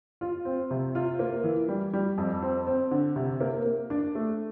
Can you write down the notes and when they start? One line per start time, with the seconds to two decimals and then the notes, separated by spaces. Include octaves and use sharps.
0.21 F4
0.45 C4
0.71 C3
0.95 F4
1.19 A#3
1.44 E3
1.69 G3
1.93 G3
2.18 F2
2.42 C4
2.67 C4
2.91 D3
3.16 C3
3.41 A#3
3.65 A#3
3.90 D4
4.15 A3